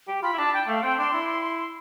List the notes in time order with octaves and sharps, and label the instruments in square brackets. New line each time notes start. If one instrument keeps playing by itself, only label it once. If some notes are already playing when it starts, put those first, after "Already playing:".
[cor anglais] G4
[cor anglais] F4 [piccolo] B5
[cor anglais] E4
[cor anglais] D4 [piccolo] A5
[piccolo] G5
[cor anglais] A3 [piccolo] F5
[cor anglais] C4 [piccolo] G5
[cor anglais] D4 [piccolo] C6
[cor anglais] E4